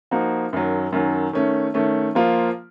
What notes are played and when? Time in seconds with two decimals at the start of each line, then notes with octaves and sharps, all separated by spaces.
0.11 F3 A#3 D#4 F#4
0.53 F#2 D#3 F#3
0.92 F#2 D#3 F#3
1.33 D#3 A3 C#4
1.74 D#3 A3 C#4
2.15 F3 A#3 F4